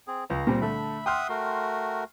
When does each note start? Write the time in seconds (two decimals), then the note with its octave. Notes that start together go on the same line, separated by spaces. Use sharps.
0.07 C4 G#4
0.30 C#2 A#5
0.47 A#2 G3 C4
0.61 D3 A3 E5 B5
1.06 E5 F#5 G5 C6 D#6 F6
1.29 A3 F#4 A#4